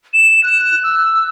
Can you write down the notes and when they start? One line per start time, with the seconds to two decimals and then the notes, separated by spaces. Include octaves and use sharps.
0.14 E7
0.43 F#6
0.83 E6